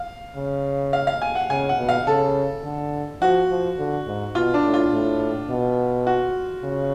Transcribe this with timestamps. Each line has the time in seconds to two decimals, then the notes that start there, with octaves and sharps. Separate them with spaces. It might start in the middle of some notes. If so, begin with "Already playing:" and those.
Already playing: F5
0.36 C#3
0.93 F5
1.07 F5
1.22 G#5
1.35 F#5
1.50 C#3 G#5
1.69 F#5
1.78 B2
1.89 F5
2.07 C#3 A4
2.64 D3
3.21 F3 F#4
3.50 F3
3.78 D3
4.07 G#2
4.35 B2 F4
4.54 D4
4.64 A2
4.74 F4
4.93 A2
5.50 B2
6.07 F#4
6.64 C#3